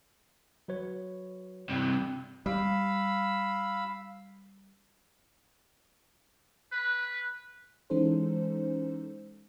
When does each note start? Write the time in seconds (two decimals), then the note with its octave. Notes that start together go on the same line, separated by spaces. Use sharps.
0.68 F#3 B4 C#5
1.69 G2 C3
2.46 G3 F5 B5 E6
6.72 B4
7.90 E3 G#3 C#4 D#4 A4 C5